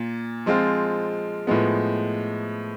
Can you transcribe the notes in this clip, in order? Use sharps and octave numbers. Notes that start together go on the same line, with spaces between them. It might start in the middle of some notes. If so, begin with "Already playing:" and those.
Already playing: A#2
F3 G#3 C4 F4
A2 F3 G#3 B3